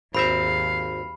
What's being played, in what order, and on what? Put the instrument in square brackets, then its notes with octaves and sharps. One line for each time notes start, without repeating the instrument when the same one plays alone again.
[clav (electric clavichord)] G#1 C4 E5 [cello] D#2 F5 [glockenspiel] B5